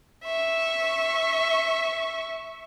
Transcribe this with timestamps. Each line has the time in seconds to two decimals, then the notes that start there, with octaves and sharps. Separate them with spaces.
0.24 E5 C#6